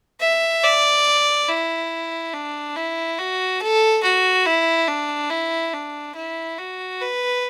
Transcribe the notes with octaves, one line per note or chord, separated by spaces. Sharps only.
E5
D5
E4
D4
E4
F#4
A4
F#4
E4
D4
E4
D4
E4
F#4
B4